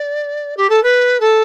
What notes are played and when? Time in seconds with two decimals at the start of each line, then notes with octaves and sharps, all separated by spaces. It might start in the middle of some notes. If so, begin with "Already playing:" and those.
Already playing: D5
0.57 G4
0.69 A4
0.83 B4
1.20 A4